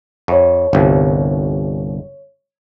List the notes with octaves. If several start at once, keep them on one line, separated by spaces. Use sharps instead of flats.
F2 C#5 C#6
G1 C2